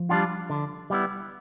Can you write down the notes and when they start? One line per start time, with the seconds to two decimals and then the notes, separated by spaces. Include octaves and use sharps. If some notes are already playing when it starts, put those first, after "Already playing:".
Already playing: F3
0.09 G3 D4 F4
0.50 D3
0.90 G3 B3 E4